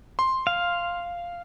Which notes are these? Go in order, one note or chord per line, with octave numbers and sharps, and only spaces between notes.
C6
F5